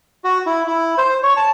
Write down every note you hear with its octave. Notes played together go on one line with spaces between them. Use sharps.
F#4
E4
E4
C5
C#5
A5